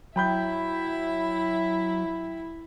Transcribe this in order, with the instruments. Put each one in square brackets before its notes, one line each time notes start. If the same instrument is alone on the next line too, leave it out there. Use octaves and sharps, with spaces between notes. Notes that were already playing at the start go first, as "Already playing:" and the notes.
[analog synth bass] F#3 [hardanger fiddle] E4 E5 [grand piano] G5 B5 G6